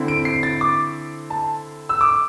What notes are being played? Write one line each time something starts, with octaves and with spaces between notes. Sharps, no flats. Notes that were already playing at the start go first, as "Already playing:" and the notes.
Already playing: D3 C4 E4
D7
C7
A6
D6
A5
E6
D6